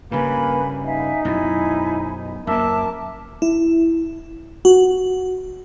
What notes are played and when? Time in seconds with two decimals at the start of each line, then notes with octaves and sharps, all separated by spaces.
0.11 G2 C#3 A#3 B4 G#5 B5
0.84 D#4 E5 F5 G#5
1.25 F#2 B2 E4 G#5 B5
2.47 F#2 A#3 A#4 E5 A5 D6
3.42 E4
4.65 F#4